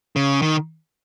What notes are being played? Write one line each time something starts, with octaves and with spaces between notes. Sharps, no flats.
C#3
D#3